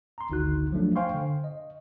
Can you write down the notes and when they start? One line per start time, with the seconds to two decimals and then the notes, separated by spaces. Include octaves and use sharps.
0.18 A#5 C6
0.30 G#1 D2 D3 D#4 F#4 F#6
0.72 F3 F#3 A3 D4
0.96 C5 F5 G5 G#5 C6 C#6
1.14 D3
1.44 D#5